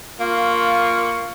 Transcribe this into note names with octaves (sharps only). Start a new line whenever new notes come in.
A#3 F4 C#6